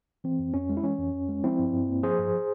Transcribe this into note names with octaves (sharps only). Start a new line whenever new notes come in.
E3 C4
F2
F2 C#4
G#3
E4
E3 C#4
F2
F2
G#3
F3 C4 E4
G2
G2
A#3
F3 G#4 C5
G2